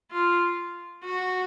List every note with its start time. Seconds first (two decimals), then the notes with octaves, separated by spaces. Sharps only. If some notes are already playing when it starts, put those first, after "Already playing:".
0.11 F4
1.04 F#4